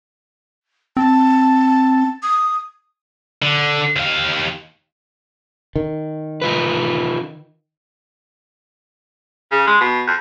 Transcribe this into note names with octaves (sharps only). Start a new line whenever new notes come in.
C4 A5
D#6
D3
D#2 F5
D#3
D#4 F4 B4
C#3
G#3
B2
F2